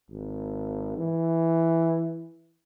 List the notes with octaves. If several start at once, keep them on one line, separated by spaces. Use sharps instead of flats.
G#1
E3